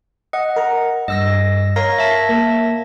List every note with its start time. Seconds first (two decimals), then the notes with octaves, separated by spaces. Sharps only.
0.33 D#5 F#5
0.56 A#4 A#5
1.08 G2 D#5 E6 A#6
1.76 A#4 C#5 F5 A#6
1.98 E5 A5 A#6
2.29 A#3